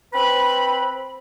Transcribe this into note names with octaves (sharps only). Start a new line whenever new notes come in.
C4 B4 B5